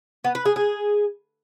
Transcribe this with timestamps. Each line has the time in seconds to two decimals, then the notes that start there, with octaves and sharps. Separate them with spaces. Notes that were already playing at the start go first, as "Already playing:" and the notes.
0.24 B3
0.35 B4
0.45 G#4
0.56 G#4